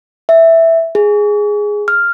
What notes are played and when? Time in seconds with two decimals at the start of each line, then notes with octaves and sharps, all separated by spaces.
0.29 E5
0.95 G#4
1.88 F6